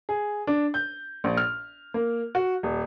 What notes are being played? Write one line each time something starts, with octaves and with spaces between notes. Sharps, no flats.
G#4
D4
G6
A#1
F6
A#3
F#4
D#1